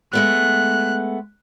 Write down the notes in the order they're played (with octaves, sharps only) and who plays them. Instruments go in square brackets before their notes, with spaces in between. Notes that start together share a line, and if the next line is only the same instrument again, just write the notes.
[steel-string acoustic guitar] G#3 A3 B3 [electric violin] F#6